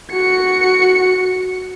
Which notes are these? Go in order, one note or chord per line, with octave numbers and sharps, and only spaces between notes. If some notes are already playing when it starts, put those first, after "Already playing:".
F#4 C#7